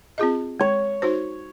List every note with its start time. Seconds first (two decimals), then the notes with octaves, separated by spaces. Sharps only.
0.18 C4 F4 G#4 D#5
0.60 G#3 C#5
1.02 D#4 F#4 C5